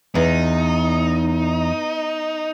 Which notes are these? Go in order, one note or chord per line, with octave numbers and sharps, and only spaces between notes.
E2 D#4